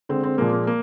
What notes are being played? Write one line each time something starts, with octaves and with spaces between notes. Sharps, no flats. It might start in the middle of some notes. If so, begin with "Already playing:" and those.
D3 G#3 C4
C4
A#2 F3 G#3 A#3
A#3
A#3